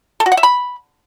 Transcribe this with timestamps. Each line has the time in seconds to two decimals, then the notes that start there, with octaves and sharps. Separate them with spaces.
0.20 A4
0.26 F#4
0.32 F#5
0.37 E5
0.43 B5